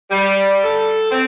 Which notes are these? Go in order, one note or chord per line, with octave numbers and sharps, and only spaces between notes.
G3
A4
C4